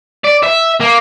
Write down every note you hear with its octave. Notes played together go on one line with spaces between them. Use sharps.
D5
E5
A#3